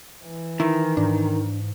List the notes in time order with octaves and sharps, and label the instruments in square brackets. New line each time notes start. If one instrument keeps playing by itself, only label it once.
[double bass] E3
[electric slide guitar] D#3 [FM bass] E4
[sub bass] G#2 [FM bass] D4